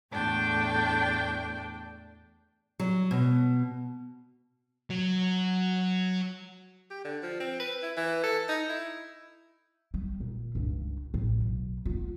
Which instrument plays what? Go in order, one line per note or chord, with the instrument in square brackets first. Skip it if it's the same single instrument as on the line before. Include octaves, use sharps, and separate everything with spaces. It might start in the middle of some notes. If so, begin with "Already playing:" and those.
[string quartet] E2 A2 A3 D4 G5
[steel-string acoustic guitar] F#3
B2
[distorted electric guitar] F#3
[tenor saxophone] G4
D3
F3
C4
B4
E4
E3
A4
D#4
E4
[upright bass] G3
A#2
C#2 G2
A1
B1
B3 F4